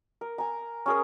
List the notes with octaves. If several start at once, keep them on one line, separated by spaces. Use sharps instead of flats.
A#4
G#5 A#5
C#4 G#4 A#4